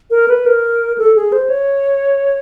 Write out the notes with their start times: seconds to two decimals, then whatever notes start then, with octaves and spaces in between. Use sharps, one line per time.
0.10 A#4
0.28 B4
0.46 A#4
0.98 A4
1.16 G#4
1.32 C5
1.49 C#5